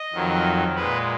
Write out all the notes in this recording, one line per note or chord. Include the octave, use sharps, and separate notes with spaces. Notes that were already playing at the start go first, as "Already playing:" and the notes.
Already playing: D#5
F2 D#3 F#3
A#2 G#3 B4